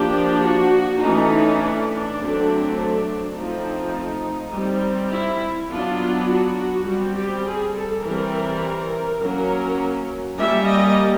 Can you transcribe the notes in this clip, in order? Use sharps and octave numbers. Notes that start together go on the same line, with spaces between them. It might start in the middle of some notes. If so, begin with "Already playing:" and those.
Already playing: F3 A#3 D4 G4
F#4
E3 A3 C#4 D#4
D4
D3 F#3 A3 C4
D4
F3 A3 C4 D#4
G3 C4
E4
F#3 B3 D4 F4
F#4
G3 C4 F#4
G4
G#4
A4
E3 G3 C4 A#4
F#3 A#3 C#4 A#4
G3 A#3 C#4 E5
D#5